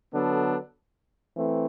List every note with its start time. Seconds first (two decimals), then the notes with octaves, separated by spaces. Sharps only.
0.14 D3 F#3 B3 D4 A4
1.37 E3 A3 C4